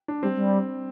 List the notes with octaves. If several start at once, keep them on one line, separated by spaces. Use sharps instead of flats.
D4
G3 C4
G3